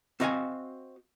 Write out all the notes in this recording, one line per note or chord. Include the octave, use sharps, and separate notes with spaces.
C4 F#4 D#5 F5 F#5 G#5